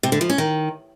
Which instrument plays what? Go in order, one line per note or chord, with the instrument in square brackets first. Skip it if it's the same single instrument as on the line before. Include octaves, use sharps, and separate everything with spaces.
[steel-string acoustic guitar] C3
D3
F3
C#4
D#3